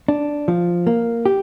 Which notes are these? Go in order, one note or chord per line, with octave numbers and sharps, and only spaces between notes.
D4
F3
A#3
G4